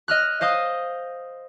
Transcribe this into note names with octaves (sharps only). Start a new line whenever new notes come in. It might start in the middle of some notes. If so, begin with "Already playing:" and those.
D#5 F6 F#6
C5 D#5 F5 D#6